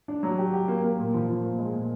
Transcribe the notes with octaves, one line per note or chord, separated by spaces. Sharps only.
D4
F#3
G4
G4
A#3
A#3
A#2
F3
F3
A#2
G#3
A#2